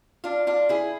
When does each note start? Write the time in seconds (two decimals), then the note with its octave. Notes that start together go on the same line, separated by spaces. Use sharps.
0.24 D4 F4
0.47 D4 F4
0.69 E4 G#4